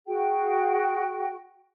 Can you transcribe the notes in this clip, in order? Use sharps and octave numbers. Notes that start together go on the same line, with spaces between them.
F#4 G#4 G5